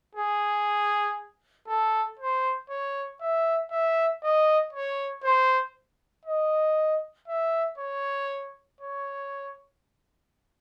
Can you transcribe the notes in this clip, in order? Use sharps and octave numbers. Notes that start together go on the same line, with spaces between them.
G#4
A4
C5
C#5
E5
E5
D#5
C#5
C5
D#5
E5
C#5
C#5